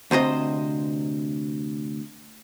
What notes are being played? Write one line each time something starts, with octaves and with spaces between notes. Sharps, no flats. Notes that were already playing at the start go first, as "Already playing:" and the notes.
D2 C3 C5 D#5